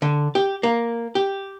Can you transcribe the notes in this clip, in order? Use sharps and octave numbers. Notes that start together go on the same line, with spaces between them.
D3
G4
A#3
G4